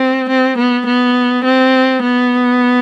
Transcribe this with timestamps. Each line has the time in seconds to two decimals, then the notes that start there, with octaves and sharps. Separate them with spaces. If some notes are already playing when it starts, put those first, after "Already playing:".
Already playing: C4
0.29 C4
0.58 B3
0.87 B3
1.45 C4
2.03 B3